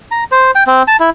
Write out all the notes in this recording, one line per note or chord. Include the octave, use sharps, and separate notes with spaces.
A#5
C5
G5
C4
A5
E4